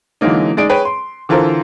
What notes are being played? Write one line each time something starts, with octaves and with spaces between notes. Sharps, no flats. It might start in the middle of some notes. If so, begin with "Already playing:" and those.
D3 E3 F#3 G#3 A#3 D#4
G#3 D#4 G#4 D5 D7
G#4 B4 C#5 G5
C6
D3 E3 F4 A4 A#4 C5